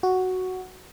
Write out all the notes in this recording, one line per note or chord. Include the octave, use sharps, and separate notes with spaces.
F#4